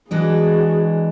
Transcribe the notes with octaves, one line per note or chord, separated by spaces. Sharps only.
E3 G#3 D4 F#4 G#4